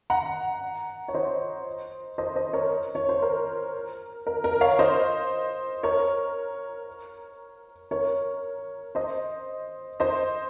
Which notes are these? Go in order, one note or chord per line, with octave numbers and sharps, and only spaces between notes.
F#5 A#5
C#5
C5 D#5
C5 D#5
C5 D#5
A#4 C#5
C#5
C5
A#4
A#4
A#4
C#5 F5
C5 D#5
A#4 C#5
A#4 C#5
C5 D#5
C5 D#5